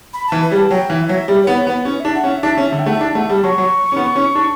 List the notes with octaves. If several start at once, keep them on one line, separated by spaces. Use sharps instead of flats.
B5
E3 A5
B4
G3
A5
F#3 G5
E3 E5
F#3 E5
G3
B3 C#5
C#5
B3
B4
C#4 C#5
D4 E5
F#5
C#4
E5
D4
C#4
D3
G5
A3 F#5
E5
D4 D5
A3 F#5
G3 A5
F#3 C#6
F#3
C#4
B3
C#4
D4